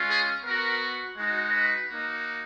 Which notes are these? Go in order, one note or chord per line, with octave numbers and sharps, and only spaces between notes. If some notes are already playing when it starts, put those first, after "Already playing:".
Already playing: G#3 C#4 F4
G#4
B3 F#4 A#4
G#3 D#4 F#4
B4
A#3 D#4 F#4